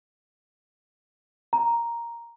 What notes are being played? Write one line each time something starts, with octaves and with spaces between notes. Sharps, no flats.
A#5